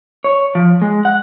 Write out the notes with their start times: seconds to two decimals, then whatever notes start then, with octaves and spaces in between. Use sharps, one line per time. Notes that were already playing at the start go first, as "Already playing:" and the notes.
0.24 C#5
0.55 F3
0.82 G#3
1.05 F#5